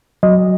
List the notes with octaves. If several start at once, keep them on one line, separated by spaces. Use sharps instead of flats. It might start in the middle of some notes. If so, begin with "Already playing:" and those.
F#3 D#5